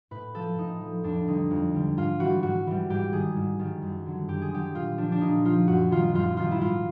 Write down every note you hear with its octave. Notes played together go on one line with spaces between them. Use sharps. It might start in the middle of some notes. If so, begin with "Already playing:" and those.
A2 B4
F3 A4
A2 D#4
F3
F2 D4
D3 G3 D#4
F2
D3 G3
G#2 F4
E3 G3 F#4
G#2 F#4
E3 G3
G#2 G4
D#3 G3 G#4
G#2
D#3 G3
F#2
D3 F#3
F#2 G4
G#4
D3 F#3 G4
A#2 F4
F3 D4
D4
A#2 D#4
F3 F4
F#2 F#4
D#3 G3 F4
F#2 F4
D#3 G3 F4
E4
G#2 F4